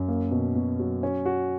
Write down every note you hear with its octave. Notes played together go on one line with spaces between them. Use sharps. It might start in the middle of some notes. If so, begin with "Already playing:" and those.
Already playing: F#2
A#3
B2
B2
F#3
C#4
F#4